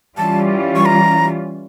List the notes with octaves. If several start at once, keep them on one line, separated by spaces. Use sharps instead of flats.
E3 G3 C#4 F4 A5
C#6
A#5